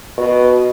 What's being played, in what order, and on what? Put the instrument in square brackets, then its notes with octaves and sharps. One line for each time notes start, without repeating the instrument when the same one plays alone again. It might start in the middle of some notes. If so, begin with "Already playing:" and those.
[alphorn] B2